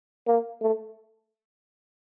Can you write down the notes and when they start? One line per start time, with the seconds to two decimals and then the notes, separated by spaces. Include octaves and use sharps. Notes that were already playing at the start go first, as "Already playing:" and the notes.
0.27 A#3
0.62 A3